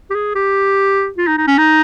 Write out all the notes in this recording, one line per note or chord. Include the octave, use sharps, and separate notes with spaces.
G4
G#4
G4
F4
D#4
D#4
C#4
D#4